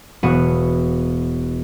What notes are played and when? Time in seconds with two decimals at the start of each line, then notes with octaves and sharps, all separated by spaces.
0.23 E1 B3 F#4 C#7 D#7